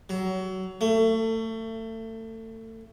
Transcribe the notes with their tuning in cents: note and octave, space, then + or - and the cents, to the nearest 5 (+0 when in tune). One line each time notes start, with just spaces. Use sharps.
F#3 +25
A3 +30